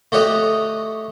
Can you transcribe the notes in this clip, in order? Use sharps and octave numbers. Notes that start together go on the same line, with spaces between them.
A3 F#4 G4 C#5 D#5